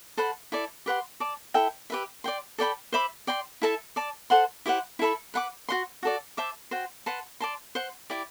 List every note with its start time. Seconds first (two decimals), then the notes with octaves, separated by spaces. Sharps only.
0.17 A4 C5 F#5 B5
0.52 E4 A4 D5
0.86 G4 B4 F#5 C6
1.20 D5 A5 D6
1.54 E4 A4 E5 G5
1.90 G4 B4 E5
2.24 D5 G5 C6
2.58 A4 D5 G5 B5
2.92 C5 E5 B5 D6
3.27 D5 G5 C6
3.62 E4 A4 E5 A5
3.96 D5 A5 D6
4.30 A4 C5 F#5 C6
4.66 E4 G4 C5 F#5
4.99 E4 A4 E5 B5
5.34 B4 F#5 B5 D6
5.69 F#4 C5 F#5 C6
6.03 F#4 A4 D5
6.37 C5 E5 A5 D6
6.71 F#4 C5 G5
7.06 B4 F#5 A5 C6
7.40 D5 A5 C6
7.75 C5 F#5 C6
8.10 E4 G4 D5